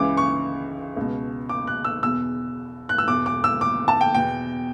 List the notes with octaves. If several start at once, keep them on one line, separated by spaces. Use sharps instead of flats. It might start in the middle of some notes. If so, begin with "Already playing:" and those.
Already playing: C#2 C#3 E3 D6
C#6
C#2 B2
D6
F#6
E6
E2 B2 E6
F#6
E6
E2 B2 D6
D6
E6
D6
A5
G5
E2 B2 G5